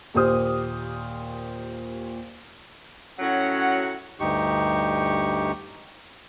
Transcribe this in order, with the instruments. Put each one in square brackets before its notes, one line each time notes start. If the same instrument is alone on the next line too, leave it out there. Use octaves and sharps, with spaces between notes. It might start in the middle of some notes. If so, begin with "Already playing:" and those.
[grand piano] D#2 A#2 G4 C5 D#6 F6
[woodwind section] A2 F#3 C#4 F#4 F#5
[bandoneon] D2 G2 D#4 G4 C#6